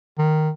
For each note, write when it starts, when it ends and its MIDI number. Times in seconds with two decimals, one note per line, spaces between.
0.18 0.50 51